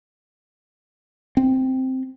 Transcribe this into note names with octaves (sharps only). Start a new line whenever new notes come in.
C4